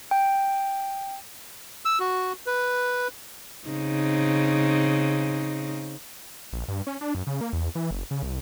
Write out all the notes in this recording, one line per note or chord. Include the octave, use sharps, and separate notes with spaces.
G5
E6
F#4
B4
C#3 C4 D#4
A#1
G2
C#4
D4
F#2
C#3
A#3
E2
E3
F#1
C#3
C2